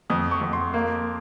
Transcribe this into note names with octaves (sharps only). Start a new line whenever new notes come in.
F2 D#6
C#6
F2
C6
A#3